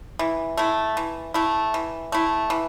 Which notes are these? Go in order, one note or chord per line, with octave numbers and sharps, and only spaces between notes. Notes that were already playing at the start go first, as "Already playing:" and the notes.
E3
A3 E4
E3
A3 E4
E3
A3 E4
E3